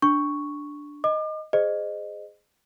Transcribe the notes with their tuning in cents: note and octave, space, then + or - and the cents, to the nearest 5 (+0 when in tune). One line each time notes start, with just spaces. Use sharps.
D4 +0 C#6 +0
D#5 +0 D6 +40
G#4 +0 C5 -10 D#5 -20